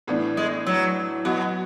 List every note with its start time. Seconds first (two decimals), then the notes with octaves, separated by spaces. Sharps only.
0.07 A2 E3 B3 D4
0.37 G#3
0.67 F#3
1.25 B2 F#3 B3 F#4